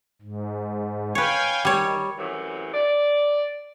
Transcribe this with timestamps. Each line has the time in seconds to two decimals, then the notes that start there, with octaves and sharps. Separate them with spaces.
0.22 G#2
1.15 B4 C#5 F5 G5 G#5
1.65 D#3 G3 C#5
2.18 F#2 A2 C3 E3
2.73 D5